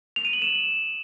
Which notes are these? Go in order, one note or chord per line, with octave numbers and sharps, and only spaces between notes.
F7
D#7
F#7
E7